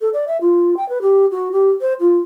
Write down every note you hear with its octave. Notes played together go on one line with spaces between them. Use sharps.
A4
D5
E5
F4
G5
B4
G4
F#4
G4
C5
F4